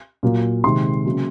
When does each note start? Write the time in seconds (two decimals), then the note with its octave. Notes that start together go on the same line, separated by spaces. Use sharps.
0.23 A#2 F#3 A#3
0.64 C3 D#3 G#3 C6
1.06 C#3 F#3 A#3